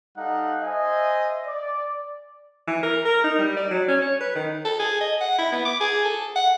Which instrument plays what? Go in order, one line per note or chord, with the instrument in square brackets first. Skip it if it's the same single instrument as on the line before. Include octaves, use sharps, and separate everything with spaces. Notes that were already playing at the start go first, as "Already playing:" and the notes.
[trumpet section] G3 D#4 A4 F5 F#5
C5 D#5 E5 G#5
D5
[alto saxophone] E3
A#4
A#4
D#4
G3
D5
F#3
C#4
C#5
B4
D#3
[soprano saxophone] A4
G#4
D#5
F#5
E4
B3
D6
G#4
A4
F#5